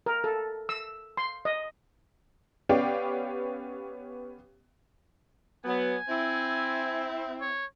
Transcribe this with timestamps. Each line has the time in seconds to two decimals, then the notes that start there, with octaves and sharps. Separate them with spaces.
0.06 A#4
0.24 A4
0.69 E6
1.17 C6
1.45 D#5
2.69 B3 C#4 G4 D5 F5 G5
5.65 F#3 B3 G#5
6.08 C4 E4
7.41 C#5